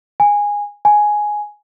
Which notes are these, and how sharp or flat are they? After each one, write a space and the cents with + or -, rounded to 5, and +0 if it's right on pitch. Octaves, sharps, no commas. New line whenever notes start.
G#5 -15
G#5 +5